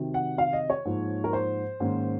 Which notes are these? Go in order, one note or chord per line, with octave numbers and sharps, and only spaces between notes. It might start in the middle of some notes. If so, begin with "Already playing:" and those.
Already playing: C3 D#3 F#3
F#5
F5
D#5
C#5
G#2 F3 A#3 D#4
A#4
C5
G#2 D#3 A#3 C#4